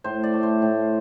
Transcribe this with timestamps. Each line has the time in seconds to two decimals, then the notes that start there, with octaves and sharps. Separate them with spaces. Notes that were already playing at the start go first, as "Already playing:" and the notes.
0.04 A2 C5
0.24 D5
0.34 A3
0.43 C5
0.62 A2